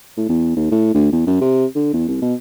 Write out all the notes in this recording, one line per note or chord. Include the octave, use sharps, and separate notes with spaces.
A2
E2
D#2
A2
D2
E2
F#2
C3
D3
E2
C2
B2